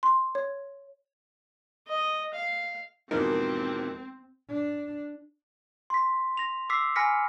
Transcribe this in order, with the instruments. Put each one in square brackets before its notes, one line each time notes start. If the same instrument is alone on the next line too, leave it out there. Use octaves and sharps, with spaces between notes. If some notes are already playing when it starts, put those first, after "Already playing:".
[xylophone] C6
C#5
[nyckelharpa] D#5
F5
[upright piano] E1 G#2 D#4 [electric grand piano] E3 F3 A#3 [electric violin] C4 [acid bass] A#4
[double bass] D4
[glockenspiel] C6 B6
A#6 F7
D6 E6 B6 C7
G#5 B5 F6 A#6 B6 C#7